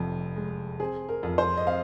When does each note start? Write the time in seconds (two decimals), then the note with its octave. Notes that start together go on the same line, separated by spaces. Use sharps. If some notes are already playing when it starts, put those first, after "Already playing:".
Already playing: F1 F2
0.36 G#3
0.80 C4 G#4
1.09 A#4
1.23 F2
1.38 C5
1.57 D#5
1.67 C4 F5